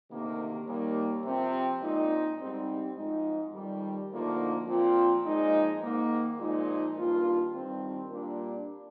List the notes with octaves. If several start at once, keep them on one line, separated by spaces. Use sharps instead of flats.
D2 C3 D#3 A#3
D#2 D#3 G3 A#3
C3 F3 C4
A#2 G#3 C4 D#4
G#2 G3 C4 D#4
G#2 F3 G#3 D#4
F2 D#3 G3
D2 D3 F3 A#3 D#4
A#2 F3 C4 F4
A#2 F3 G#3 D#4
G#2 D#3 A#3
A#2 F3 G#3 D#4
G2 D#3 A#3 F4
G2 D#3 G3 C4
A#2 G3 A#3 D4